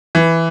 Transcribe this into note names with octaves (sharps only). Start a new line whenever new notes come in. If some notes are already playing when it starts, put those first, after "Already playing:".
E3